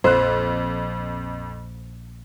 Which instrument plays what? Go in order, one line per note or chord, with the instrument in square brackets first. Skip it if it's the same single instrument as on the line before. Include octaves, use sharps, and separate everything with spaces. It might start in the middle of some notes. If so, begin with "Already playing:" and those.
[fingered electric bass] A#1 [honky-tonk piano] F2 F#6 [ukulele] C5